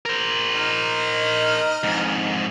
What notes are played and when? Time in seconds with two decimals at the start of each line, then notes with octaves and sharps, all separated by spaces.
0.05 A#4 C5
0.55 D#4 D#5 F6
1.84 F2 G#2